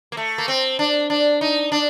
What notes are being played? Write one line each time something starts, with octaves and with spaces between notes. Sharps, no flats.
A#3
A3
A#3
C4
D4
D4
D#4
D4